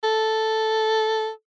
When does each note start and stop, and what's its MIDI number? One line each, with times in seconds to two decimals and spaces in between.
0.03 1.29 69